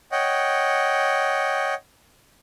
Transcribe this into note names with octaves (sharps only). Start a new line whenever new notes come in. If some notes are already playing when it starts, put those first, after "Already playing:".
C#5 D#5 F#5 G5